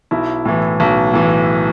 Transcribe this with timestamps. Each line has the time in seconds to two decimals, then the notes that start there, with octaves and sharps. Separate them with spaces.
0.11 B1 E4
0.45 A2 E3
0.80 B1
1.13 A2 E3